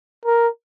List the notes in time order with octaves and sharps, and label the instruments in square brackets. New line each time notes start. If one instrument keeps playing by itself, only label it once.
[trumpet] A#4